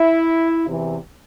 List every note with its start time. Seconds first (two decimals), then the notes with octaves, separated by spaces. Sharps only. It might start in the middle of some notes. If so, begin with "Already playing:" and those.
Already playing: E4
0.66 E2 C3 E3